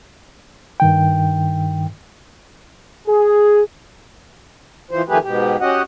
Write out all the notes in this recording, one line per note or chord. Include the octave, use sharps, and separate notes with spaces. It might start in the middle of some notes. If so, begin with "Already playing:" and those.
G2 D#3 G5
G#4
E3 F3 C5
D#3 F3 A3 G4 G#4 B4
G#2 B2 G4
C#4 F#4 G4 D#5 F#5